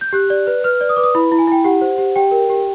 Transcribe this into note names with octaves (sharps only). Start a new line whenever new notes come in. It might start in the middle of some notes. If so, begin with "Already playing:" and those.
G6
G4 F#6
D5
B4
B4 F6
D5
D#6
B4 D6
D#6
E4 B5
E4
G#5
E4 G5
G4 F#5
C5
G4
G4 G5
A#4
G4